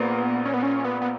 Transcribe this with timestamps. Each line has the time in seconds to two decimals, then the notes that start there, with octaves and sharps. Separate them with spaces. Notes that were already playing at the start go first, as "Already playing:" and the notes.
Already playing: A#1 A#2 A#3 B3
0.46 C#4
0.54 B3
0.63 C#4
0.84 B3
1.02 B3